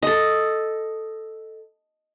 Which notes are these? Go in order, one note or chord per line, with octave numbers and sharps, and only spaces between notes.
A4 D#5